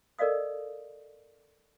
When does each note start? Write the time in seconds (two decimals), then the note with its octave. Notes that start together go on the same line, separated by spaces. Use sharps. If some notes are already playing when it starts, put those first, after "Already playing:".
0.19 A4 A#4 D5 D#5 F5 D#6